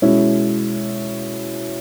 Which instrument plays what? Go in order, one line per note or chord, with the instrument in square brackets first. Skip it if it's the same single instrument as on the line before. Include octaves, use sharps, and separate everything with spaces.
[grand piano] B2 G#3 C#4 E4